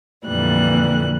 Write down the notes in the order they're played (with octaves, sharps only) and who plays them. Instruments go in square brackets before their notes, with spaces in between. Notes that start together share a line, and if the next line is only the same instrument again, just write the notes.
[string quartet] F2 A#2 D3 E3 G3 F#6